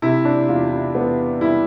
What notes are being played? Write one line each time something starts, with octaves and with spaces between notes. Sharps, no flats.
C3 E4
D4
E2 F4
E4
E2 B3
G3 E4